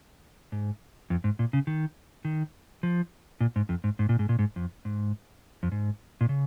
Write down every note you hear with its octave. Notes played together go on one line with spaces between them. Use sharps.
G#2
F2
G#2
A#2
C#3
D#3
D#3
F3
A#2
G#2
F2
G#2
G#2
A#2
G#2
A#2
G#2
F2
G#2
F2
G#2
A#2
C#3